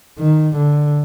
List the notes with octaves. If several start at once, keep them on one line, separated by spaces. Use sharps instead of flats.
D#3
D3